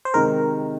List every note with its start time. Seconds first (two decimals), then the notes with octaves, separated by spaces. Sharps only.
0.05 C5
0.14 C3 D#3 G#3 A#4